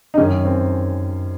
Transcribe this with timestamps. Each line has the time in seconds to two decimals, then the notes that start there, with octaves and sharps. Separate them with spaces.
0.14 D#4
0.18 F#2 D#3 C#4
0.45 C4